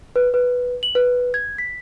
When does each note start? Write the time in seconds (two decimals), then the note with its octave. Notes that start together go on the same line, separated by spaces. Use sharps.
0.16 B4
0.34 B4
0.83 F#7
0.95 B4
1.34 G#6
1.58 B6